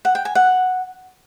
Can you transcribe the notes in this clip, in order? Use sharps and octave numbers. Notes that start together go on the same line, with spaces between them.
F#5
G5
G#5
F#5